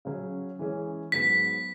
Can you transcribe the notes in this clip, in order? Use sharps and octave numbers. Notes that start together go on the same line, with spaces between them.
C#3 F#3 C#4
E3 G#3 C#4 G#4
G#2 F#3 B3 B6